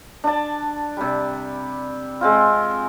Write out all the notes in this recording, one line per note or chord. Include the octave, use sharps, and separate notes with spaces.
D4 A5
C3 G3
G#3 C4 F4